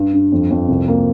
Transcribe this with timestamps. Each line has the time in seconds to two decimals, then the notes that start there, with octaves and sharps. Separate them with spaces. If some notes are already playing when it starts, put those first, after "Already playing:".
Already playing: G2
0.13 G2
0.32 F2
0.51 F2
0.68 C2
0.88 A#3